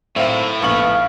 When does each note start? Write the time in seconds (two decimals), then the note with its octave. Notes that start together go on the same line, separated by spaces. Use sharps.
0.16 A2 D#3 F#3 C4 E4 E5 F5
0.62 A#1 G#2 C#3 B3 F5 C#6 F#7